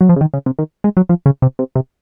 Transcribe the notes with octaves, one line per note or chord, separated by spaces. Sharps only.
F#3
F3
C#3
D#3
C#3
C3
D#3
G#3
F#3
F3
C#3
C3
C3
C3